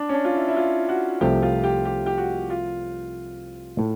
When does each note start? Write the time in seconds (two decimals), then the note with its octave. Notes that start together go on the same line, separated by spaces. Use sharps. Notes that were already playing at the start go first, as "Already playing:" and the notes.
Already playing: D4
0.09 C#4
0.14 D4
0.25 F4
0.35 E4
0.48 E4
0.56 F4
0.89 F#4
1.21 C2 C3 F3 A3 G4
1.42 F4
1.64 G4
1.85 G4
2.06 G4
2.18 F#4
2.50 F4
3.79 A2